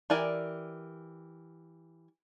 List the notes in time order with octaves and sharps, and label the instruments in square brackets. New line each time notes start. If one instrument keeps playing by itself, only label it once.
[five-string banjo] E3 G4 A#4 D5 G#5